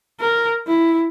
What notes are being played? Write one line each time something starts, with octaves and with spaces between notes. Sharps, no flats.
A#4
E4